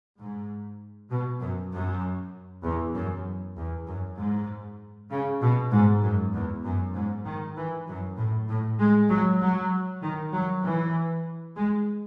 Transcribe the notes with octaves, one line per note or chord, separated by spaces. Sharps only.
G#2
B2
F#2
F#2
E2
F#2
E2
F#2
G#2
C#3
B2
G#2
F#2
E2
F#2
G#2
D#3
E3
F#2
A2
A2
G#3
F#3
F#3
D#3
F#3
E3
G#3